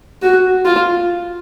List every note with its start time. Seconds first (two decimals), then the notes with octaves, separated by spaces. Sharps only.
0.22 F#4
0.65 F4